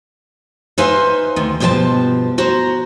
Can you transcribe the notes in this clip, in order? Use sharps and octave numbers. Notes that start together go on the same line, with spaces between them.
D#4 B4 C5 E5 F5 G#5
D2 D#3
G2 B2 F3 G#4 C5 A5
F#4 C5 A#5